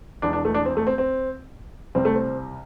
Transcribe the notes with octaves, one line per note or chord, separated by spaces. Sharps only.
E1 E2 E3 D4
D4
A3
D4
C4
A3
C4
C4
C2 C3 G3 C4
A3
C4